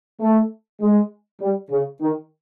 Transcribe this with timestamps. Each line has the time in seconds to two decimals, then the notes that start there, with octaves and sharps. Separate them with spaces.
0.20 A3
0.81 G#3
1.41 G3
1.70 C#3
2.01 D#3